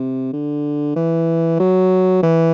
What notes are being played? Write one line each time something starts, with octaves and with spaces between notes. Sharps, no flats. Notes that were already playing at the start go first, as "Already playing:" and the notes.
Already playing: C3
D3
E3
F#3
E3